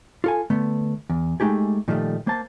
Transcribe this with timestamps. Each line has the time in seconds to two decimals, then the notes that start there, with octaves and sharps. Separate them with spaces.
0.24 F4 A4 G#5
0.50 D3 A3 B3
1.10 E2
1.40 G#3 A3 D#4 G4 G#4
1.88 A#2 D#3 F3 G3 A3
2.27 A#3 C5 A5